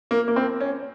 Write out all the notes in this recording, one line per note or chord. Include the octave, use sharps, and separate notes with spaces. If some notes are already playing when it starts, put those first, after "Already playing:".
A#3
A#3
C4
C#4